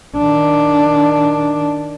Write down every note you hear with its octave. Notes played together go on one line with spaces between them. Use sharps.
D#3 D4